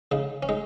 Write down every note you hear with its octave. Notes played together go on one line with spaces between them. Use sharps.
C#3 D#4
C#4
G#3 D#4